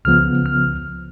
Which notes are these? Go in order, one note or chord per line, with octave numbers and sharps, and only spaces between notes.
C#2 C#3 F3 B3 F6
F6